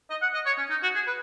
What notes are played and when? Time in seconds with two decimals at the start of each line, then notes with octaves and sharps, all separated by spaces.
0.10 D#5
0.22 F#5
0.34 D#5
0.46 C#5
0.58 C#4
0.70 D#4
0.83 F#4
0.95 G#4
1.07 B4